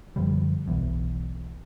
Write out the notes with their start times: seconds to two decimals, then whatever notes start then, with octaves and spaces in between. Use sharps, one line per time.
0.16 F#2 D3 F3 G3
0.68 E1 B1 E2